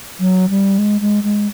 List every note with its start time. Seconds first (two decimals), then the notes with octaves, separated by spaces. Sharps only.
0.20 F#3
0.50 G3
0.78 G#3
1.01 G#3
1.23 G#3